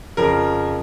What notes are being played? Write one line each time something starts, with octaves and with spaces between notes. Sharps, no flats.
F2 C#3 F3 A#4